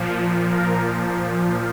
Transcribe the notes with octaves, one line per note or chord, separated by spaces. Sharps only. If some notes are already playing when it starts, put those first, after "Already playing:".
Already playing: A#2 F3
A#4